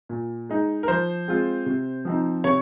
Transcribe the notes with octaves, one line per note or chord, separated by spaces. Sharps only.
A#2
G#3 D#4
A#4
F3 C5
G#3 C4 F4
C3
F3 C4 D#4
C3 C#5